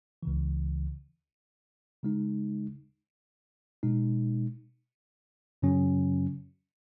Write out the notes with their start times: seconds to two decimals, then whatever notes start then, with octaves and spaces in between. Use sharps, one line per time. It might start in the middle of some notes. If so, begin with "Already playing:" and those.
0.23 C#2 C#3 E3
2.03 C#3 G#3 D#4
3.83 B2 G#3 D#4
5.62 F#2 C#3 F#3 C#4